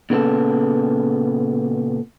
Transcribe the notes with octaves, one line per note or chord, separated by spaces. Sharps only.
A#2 C#3 B3 A4